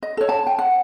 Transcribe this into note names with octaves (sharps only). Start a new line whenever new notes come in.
D#5
A4 C#5
A5
G5
F#5